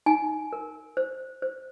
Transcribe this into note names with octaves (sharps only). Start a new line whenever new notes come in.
D#4 G#5
A#4
C5
C5